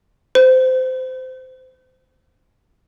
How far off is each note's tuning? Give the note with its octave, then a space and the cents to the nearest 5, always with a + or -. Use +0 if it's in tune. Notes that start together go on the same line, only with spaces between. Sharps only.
C5 -20